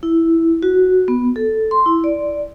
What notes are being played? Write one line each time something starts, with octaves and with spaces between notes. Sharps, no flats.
E4
F#4
B3
A4
C6
E4
D5